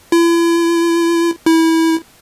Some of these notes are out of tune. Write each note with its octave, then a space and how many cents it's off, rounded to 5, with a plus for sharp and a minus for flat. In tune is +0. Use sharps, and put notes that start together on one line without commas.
E4 +40
E4 -20